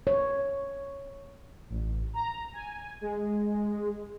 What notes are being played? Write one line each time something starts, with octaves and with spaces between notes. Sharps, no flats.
C#5
A1
A#5
G#5
G#3